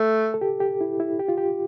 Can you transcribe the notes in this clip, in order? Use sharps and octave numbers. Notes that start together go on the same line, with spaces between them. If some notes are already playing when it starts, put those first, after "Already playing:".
Already playing: A3
A4
G4
G4
E4
E4
G4
F4
G4